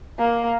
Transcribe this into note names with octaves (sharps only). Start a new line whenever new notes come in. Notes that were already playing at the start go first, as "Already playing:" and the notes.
A#3